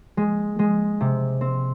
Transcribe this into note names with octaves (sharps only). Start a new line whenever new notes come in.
G#3
G#3
C3
C4